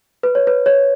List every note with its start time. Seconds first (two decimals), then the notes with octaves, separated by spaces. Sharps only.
0.23 B4
0.35 C#5
0.47 B4
0.66 C#5